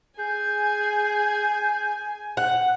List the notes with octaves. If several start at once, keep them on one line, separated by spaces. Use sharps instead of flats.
G#4 G#5 G6
F#5